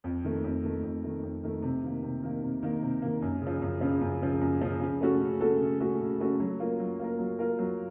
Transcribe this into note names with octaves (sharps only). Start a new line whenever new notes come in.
F2
D#3 A3
F2
D#3 A3
F2
D#3 A3
F2
D#3 A3
C3
D#3 A#3
C3
D#3 A#3
C3
D#3 A#3
C3
D#3 A#3
F#2
C#3
F3
F#2
C#3 F3
F#2
C#3 F3
F#2
C#3 F3
C#3
A3 C#4 F#4 A4
C#3
A3 C#4 F#4 A4
C#3
A3 C#4 F#4 A4
C#3
A3 C#4 F#4 A4
F#3
A#3 F4 A#4
F#3
A#3 F4 A#4
F#3
A#3 F4 A#4
F#3